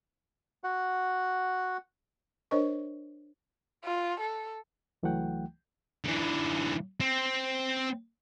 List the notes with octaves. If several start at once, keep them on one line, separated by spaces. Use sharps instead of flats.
F#4 F#5
D4 A#4 C5 C#5 D#5 C#6
F4
A4
C#2 E3 F#3 A3 F#5 G5
D3 E3
C4